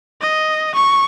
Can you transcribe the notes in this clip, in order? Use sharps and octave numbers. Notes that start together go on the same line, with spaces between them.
D#5
C#6